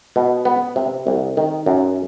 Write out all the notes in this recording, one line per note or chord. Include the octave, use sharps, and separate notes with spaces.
B2
B3
C3
C2
D#3
F#2